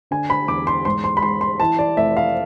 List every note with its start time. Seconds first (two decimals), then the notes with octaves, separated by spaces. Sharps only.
0.11 D3 G#5
0.30 B5
0.48 E2 D6
0.67 C6
0.85 G#2 C6
1.04 C6
1.17 B5
1.23 G#3 C6
1.41 C6
1.60 E3 A5
1.79 D5
1.97 F1 E5
2.17 F5